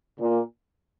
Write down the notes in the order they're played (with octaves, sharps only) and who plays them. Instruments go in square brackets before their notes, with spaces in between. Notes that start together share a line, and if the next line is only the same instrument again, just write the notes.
[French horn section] A#2